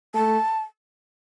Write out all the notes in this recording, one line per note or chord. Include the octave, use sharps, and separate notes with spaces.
A3 A5